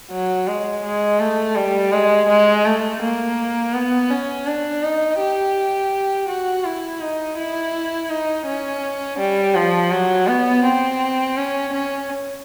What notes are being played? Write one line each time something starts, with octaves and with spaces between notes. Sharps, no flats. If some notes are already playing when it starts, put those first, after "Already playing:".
F#3
G#3
G#3
A3
G3
G#3
G#3
A3
A#3
B3
C#4
D4
D#4
G4
F#4
E4
D#4
E4
D#4
C#4
G3
F3
F#3
B3
C4
C#4
C#4